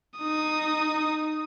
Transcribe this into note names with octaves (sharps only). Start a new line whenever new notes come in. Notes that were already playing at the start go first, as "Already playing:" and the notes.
D#4 D#6